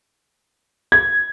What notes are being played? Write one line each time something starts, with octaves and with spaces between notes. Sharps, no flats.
G#6